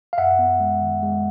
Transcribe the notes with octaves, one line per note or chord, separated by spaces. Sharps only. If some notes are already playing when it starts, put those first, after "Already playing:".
F5
F#2 E5 F#5
B3
G#3
D#3
G#3